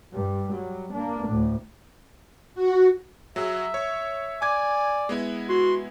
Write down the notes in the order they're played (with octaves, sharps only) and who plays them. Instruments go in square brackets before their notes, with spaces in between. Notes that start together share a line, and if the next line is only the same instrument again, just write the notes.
[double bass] G2 G3
F#3 G3
A#3 D4
D2 A2
[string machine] F#4
[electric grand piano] F#3 G#4 [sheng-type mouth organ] E5
[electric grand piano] C#5
[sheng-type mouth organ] D5 [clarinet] G#5 [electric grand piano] D6 G#6
[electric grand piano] G#3 B3 E4
[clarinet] F#4 [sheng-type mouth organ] C6